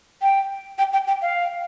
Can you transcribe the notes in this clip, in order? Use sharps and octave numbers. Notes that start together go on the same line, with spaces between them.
G5
G5
G5
G5
F5